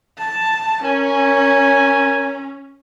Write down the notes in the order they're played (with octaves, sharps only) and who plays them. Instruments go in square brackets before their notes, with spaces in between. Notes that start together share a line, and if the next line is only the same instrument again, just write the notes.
[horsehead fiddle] A5
[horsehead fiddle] C#4 [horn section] A#4 C#5 G#5